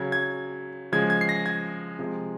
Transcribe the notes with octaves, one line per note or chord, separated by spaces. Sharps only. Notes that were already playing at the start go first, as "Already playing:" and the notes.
Already playing: C#3 F#3 G#6
G#6
C#3 F3 G#3 G#6
G#6
C7
A#6
G#6
C3 F3 G#3